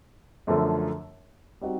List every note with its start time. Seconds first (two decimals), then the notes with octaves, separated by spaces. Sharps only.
0.47 F#2 D3 F3 A3
1.61 G3 C4 D#4 F#4